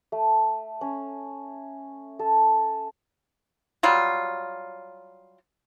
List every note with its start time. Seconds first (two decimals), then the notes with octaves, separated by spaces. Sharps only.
0.12 A3
0.81 C#4
2.19 A4
3.83 F#3 G3 F4